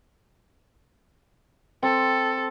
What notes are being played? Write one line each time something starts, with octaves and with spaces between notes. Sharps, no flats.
C4 A4